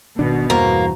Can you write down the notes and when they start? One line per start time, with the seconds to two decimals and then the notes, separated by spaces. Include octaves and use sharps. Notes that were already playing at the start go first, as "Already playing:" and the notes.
0.19 G#1 B2 D#3 D4
0.50 E2 G2 E3 A#3 F#4 C5 A#5